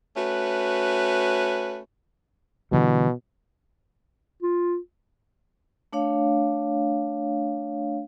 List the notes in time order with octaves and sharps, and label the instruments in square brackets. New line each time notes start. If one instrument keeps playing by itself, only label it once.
[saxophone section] A3 C#4 F#4 B4
[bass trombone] B2 [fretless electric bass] D3 E3 G3
[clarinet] F4
[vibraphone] A3 D4 C#5 F5